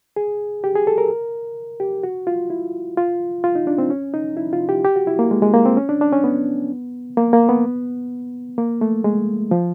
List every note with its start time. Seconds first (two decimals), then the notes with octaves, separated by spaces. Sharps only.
0.16 G#4
0.64 G4
0.75 G#4
0.87 A4
0.98 A#4
1.80 G4
2.03 F#4
2.27 F4
2.50 E4
2.98 F4
3.44 F4
3.55 D#4
3.67 D4
3.78 C4
3.90 C#4
4.14 D#4
4.37 E4
4.53 F4
4.69 G4
4.85 G4
4.96 F#4
5.07 E4
5.19 A#3
5.31 G#3
5.42 G#3
5.54 A#3
5.66 C4
5.77 C#4
5.89 D4
6.01 D4
6.12 C#4
6.24 B3
7.17 A#3
7.33 A#3
7.49 B3
8.58 A#3
8.81 A3
9.04 G#3
9.51 F3